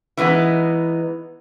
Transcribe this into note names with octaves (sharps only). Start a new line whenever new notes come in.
E3 G#3 B3 D#4